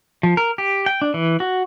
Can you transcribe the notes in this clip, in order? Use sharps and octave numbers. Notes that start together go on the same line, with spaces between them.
F3
A#4
G4
G5
D4
E3
F#4